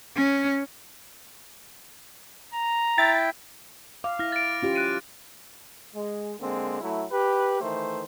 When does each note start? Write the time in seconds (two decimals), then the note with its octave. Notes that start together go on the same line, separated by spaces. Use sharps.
0.16 C#4
2.54 A#5
2.98 E4 E5 G5 A6
4.04 F5 D6
4.19 E4 F6 A#6
4.32 A6 D7
4.62 C#4 F4 G4
4.75 F#6 D7 D#7
5.95 G#3
6.40 D3 G#3 A#3 C4
6.81 F#3 A3 E4
7.11 G4 B4
7.61 D#3 E3 A3 C5